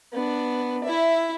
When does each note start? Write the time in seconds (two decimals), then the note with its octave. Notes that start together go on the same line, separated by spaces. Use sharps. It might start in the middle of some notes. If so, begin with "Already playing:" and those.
0.13 B3 D4
0.83 E4 E5